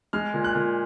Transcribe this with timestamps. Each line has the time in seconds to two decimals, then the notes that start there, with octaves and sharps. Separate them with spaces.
0.13 G#3 F6
0.34 A#2
0.44 F#6
0.55 A#2